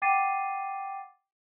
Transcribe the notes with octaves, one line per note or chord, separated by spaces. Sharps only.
F#5 G5 D6 A6 C7 D#7